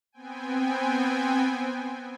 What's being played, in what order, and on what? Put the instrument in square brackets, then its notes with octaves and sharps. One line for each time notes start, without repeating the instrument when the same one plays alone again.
[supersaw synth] B3 C4 G5 G#5